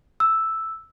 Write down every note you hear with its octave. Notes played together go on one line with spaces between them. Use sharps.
E6